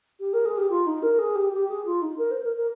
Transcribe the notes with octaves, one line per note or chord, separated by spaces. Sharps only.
G4
A#4
G#4
G4
F4
D#4
A#4
G#4
G4
G4
G#4
F4
D#4
A#4
C5
A#4
A#4